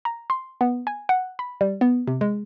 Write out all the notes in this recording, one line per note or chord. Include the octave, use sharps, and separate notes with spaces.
A#5
C6
B3
G#5
F#5
B5
G3
B3
C3
G#3